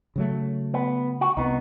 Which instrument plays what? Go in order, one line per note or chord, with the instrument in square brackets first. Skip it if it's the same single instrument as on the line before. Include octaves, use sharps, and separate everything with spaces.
[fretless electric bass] C#3 F#3 A3
[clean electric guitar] B3
F#4
[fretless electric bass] C2 [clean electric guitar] B3 D#4